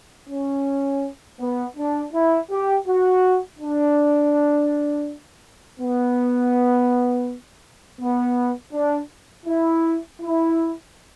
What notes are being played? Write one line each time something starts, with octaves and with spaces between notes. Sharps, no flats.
C#4
B3
D4
E4
G4
F#4
D4
B3
B3
D4
E4
E4